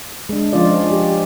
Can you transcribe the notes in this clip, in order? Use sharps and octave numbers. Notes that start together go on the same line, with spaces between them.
G#3 D4
F3 C#4 D4 F4 D5
G4